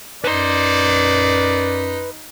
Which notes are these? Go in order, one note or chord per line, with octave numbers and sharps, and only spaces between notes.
F#2 D#4 B4 D5 C6